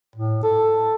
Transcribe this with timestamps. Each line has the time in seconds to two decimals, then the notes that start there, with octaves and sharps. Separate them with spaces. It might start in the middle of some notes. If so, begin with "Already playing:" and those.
0.16 A2
0.43 A4